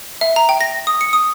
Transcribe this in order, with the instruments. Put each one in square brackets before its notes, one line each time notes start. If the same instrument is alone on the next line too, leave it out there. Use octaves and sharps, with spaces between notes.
[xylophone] E5
A#5
G5
A#6
D#6
C#7
D#6